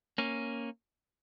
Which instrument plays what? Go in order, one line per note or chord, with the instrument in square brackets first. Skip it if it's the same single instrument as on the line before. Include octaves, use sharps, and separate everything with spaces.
[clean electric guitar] A#3 C#4